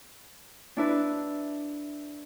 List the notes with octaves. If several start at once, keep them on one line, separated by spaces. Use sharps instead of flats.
D4 E4 B4